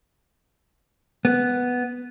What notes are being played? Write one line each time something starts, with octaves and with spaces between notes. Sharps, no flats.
B3